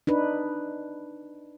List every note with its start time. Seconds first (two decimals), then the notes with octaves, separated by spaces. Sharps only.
0.07 D4 D#4 B4